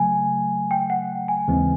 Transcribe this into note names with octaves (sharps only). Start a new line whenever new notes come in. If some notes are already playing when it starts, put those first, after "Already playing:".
Already playing: C#3 F#3 A3 G#5
G5
F#5
G#5
D#2 C#3 E3 G#3 C4